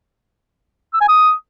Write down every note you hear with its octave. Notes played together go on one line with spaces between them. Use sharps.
E6
G#5
D#6